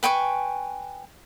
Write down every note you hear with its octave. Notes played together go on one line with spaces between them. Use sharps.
B4 G5 G#5 C#6